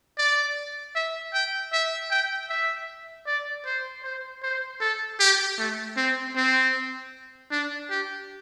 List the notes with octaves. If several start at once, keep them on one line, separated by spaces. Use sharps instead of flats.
D5
E5
G5
E5
G5
E5
D5
C5
C5
C5
A4
G4
A3
C4
C4
D4
G4